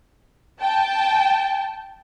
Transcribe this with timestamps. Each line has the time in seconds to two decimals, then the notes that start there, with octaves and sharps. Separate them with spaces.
0.60 G5 A5